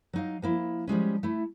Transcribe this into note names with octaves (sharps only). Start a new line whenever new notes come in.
F#3 D#4 F5
F3 A#3 E4
F3 G3 G#3 C#4
A3 E4